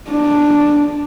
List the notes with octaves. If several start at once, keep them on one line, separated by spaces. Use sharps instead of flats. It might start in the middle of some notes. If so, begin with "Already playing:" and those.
D4